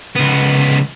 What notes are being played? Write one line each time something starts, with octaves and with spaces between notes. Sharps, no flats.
C#2 B3